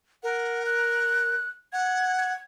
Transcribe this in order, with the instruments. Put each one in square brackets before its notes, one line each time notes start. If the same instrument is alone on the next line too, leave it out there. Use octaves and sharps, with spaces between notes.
[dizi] A#4 [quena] F#5
[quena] F#6
[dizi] F#5 [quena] G#6
[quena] G#6